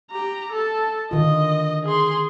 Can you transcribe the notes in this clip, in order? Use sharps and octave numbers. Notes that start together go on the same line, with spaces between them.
G4 A#5
A4 A5
D3 D#3 F4 D#5
G#4 C6